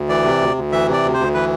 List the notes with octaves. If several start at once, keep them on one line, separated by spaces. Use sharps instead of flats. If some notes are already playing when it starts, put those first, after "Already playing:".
Already playing: D2
E3 D5
C3
D2
D2
E3 E5
C3 D5
D2
D2 C5
E3 B4